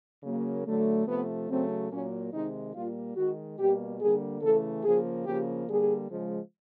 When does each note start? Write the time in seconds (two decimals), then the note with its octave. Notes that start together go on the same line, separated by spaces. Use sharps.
0.23 C#3 F#3 A#3
0.66 D3 F#3 A3
1.07 C3 F3 A3 B3
1.50 C#3 F#3 A3 C4
1.91 A#2 F#3 A#3 C#4
2.32 C3 D#3 G#3 D#4
2.74 A#2 G3 A#3 F4
3.16 D#3 G#3 F#4
3.58 B2 G3 A#3 G4
4.00 D3 G3 A#3 G#4
4.42 C#3 E3 A3 A4
4.84 C#3 F3 A#3 G#4
5.26 C#3 F3 A#3 G4
5.68 D3 G3 A#3 G#4
6.09 C#3 F3 G#3